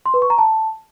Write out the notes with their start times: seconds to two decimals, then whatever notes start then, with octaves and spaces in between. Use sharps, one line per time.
0.06 C6
0.14 B4
0.22 C#6
0.30 A#5
0.38 A5